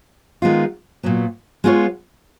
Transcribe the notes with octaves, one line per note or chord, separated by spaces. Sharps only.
D#3 G#3 B3 F4
A#2 F#3 B3
G#3 B3 F4 A#4 C#5